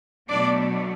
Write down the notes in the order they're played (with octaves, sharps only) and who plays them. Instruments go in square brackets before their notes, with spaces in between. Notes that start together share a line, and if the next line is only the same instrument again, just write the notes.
[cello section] B2 F#3 A3 D4 D5